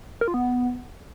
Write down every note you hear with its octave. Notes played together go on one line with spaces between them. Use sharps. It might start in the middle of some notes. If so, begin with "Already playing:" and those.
A#4
F4
B3